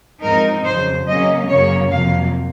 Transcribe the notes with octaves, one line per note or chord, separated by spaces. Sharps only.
G#2 F3 C4 D#4 A#4
F2 C#3 F#3 C5
C#3 F#3 A#3 C#4 D#5
F#2 C#3 F#3 A#3 C#5
F2 C3 F#3 A#3 F5